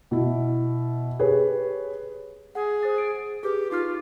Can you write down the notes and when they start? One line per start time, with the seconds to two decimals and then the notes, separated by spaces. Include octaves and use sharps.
0.11 B2 E4
1.19 G4 G#4 B4 C#5
2.55 G#4 F#5
2.83 C5 D#6 A6
2.98 D7
3.43 G4 G#4 B4
3.71 D#4 F4 G4 F6